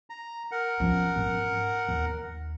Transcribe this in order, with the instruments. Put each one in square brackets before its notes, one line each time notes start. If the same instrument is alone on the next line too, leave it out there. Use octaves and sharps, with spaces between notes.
[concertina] A#5
A#4 F#5
[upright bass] F3 C#4
G#2 C#4
D#2